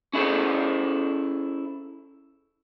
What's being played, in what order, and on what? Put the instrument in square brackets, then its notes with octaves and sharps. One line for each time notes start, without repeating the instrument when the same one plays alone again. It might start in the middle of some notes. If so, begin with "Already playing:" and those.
[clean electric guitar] C#4 E4 G#4 A4 C5